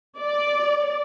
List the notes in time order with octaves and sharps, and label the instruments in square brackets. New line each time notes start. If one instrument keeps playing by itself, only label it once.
[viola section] D5